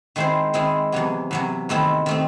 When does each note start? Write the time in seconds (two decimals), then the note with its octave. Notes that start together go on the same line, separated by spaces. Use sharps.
0.16 D#3 G#3 C4 E4 C5
0.53 D#3 G#3 C4 E4 C5
0.92 E2 C3 F#3
1.31 E2 C3 F#3
1.69 E2 D#3 A3 C4 E4
2.06 D#3 A3 C4